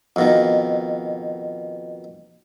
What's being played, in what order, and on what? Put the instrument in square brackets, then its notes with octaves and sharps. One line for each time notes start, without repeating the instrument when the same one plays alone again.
[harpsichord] F2 B2 D#3